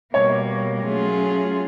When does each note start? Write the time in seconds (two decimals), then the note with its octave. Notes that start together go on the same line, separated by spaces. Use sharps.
0.14 B2 G3 A#3 C#5
0.85 F#3 A3 C#4 F4 G#4